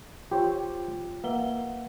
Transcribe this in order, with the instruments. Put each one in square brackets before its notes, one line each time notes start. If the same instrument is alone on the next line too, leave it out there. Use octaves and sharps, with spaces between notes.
[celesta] F4 G5 [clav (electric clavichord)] G4 C5 C#5
[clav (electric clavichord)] A#3 E5 [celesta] B4 F#5 G7